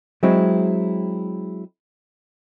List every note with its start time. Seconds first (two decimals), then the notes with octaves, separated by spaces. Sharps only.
0.23 F#3 G#3 C4 E4